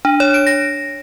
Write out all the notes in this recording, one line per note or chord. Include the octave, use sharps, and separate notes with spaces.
D4
C#5
D7
A#6